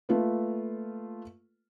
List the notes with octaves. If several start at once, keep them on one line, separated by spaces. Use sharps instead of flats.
A3 A#3 F4 A4 B4